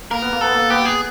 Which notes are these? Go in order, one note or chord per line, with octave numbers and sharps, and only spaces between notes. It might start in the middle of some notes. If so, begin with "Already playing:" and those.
A#3 A#4
B3
A#3
B3 A4
A#3
B3 G4
G#4